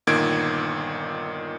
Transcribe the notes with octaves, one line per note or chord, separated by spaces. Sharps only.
G1 A#2 D#3 G#6 D7